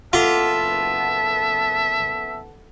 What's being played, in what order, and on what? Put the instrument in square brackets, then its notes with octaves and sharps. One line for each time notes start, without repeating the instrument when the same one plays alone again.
[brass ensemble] F#1 B3 A5 [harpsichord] F4 [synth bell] A4 F#5 [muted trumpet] E5